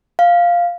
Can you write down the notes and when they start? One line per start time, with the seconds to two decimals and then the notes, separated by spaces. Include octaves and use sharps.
0.19 F5